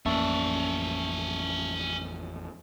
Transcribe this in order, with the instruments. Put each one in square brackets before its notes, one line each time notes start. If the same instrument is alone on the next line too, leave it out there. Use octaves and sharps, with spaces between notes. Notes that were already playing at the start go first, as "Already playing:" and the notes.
[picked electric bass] A1 F2 A#3 [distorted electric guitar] C#4 D5 [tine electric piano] E5 A5 C#6